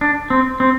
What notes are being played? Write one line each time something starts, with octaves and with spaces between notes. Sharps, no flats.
D4
C4
C4